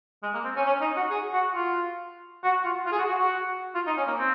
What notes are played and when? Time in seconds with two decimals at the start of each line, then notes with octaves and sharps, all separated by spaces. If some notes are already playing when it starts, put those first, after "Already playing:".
0.23 G#3
0.34 A#3
0.45 C4
0.56 C#4
0.66 C#4
0.81 D#4
0.96 F#4
1.10 G#4
1.33 F#4
1.55 F4
2.43 F#4
2.64 F4
2.86 F4
2.92 G#4
2.98 F#4
3.09 F#4
3.19 F#4
3.75 F4
3.86 D#4
3.97 C#4
4.08 A#3
4.19 C4